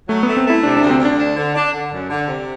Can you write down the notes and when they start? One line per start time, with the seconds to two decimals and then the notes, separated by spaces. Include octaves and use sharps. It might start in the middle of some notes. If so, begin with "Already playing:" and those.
0.09 F#3 A3
0.23 A3 B3
0.37 C4
0.45 A3 E4
0.63 C3 D4
0.77 D4
0.82 D2
0.90 C4
1.00 D2
1.05 D4
1.18 D4
1.36 D3
1.54 D4
1.73 D3
1.91 F#2
2.09 D3
2.28 C3